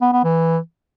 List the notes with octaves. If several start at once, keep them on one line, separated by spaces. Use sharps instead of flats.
B3
B3
E3